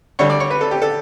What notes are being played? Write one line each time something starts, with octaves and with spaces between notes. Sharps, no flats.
D2 D3 G3 C#5
D5
C#5
B4
A4
G4
A4